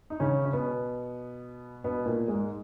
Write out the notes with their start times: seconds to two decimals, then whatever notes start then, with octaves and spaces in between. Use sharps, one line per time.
0.10 D#4
0.20 C#3 C#4
0.46 C#4
0.53 B2 B3
1.84 B2 B3
2.06 A#2 A#3
2.28 G#2 G#3